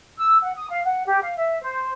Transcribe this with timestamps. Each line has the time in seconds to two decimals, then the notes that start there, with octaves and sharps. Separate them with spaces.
0.17 E6
0.42 F#5
0.55 D#6
0.70 F5
0.84 F#5
1.06 G4
1.22 F5
1.37 E5
1.60 C5